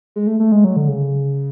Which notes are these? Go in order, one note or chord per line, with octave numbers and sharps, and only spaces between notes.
G#3
A3
A3
G#3
F#3
D3
C#3